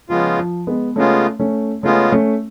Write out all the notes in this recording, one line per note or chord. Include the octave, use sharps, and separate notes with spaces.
C#3 F3 G#3 B3 F4
F3
G#3 B3
C#3 G#3 A3 B3 C#4 F4
A3 C#4
C#3 G#3 A3 B3 C#4 F4
A3 C#4